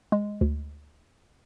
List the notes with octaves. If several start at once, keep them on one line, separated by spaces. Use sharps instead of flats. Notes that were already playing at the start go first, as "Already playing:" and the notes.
G#3
D2